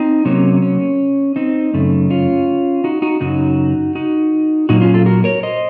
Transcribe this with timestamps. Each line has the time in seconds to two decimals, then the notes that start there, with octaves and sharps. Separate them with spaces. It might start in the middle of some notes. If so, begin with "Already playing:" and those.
Already playing: C4 D#4
0.25 C3 F#3 A#3 C#4
0.62 C#4
1.36 C4 D#4
1.74 F#2 C#3 A3
2.10 C#4 F4
2.84 D#4 F#4
3.02 D#4 F#4
3.21 F#2 C#3 F#3 D#4 F#4
3.95 D#4 F#4
4.69 A#2 F#3 A#3 D#4 F#4
4.81 C#4 F4
4.94 F4 A4
5.06 F#4 A#4
5.24 A#4 C#5
5.43 C5 D#5